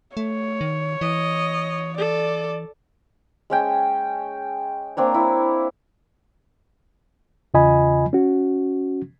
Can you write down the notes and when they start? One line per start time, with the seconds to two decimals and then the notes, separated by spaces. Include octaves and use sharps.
0.17 A3 C#5
0.61 D#3
1.01 E3 D#5
1.98 A4 D5
3.50 G#3 C#4 G5 G#5
4.97 A#3 C4 D4 C#5
5.14 E4
7.54 E2 C#3 F4 D#5 G#5 B5
8.13 C#4 F#4